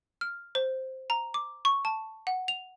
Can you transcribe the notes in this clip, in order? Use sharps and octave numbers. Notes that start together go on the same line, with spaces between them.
F6
C5
A#5
D6
C#6
A5
F#5
F7